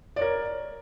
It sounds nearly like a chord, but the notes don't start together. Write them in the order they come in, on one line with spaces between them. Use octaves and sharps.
D5 C#5 A#4